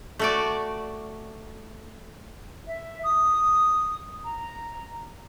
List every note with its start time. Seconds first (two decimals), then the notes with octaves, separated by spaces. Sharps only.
0.19 A3 F#4 D5
2.67 E5
3.04 D#6
4.24 A#5